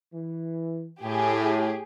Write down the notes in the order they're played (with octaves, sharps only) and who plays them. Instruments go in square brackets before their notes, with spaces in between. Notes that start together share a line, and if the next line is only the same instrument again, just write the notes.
[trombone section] E3
[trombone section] A2 [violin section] G4 G#4